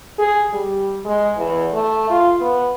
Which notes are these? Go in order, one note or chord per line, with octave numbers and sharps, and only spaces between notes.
G#4
G3
G#3
E2
A3
F4
B3